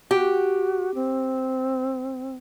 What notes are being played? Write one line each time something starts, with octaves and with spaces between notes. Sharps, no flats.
F#4 G4
C4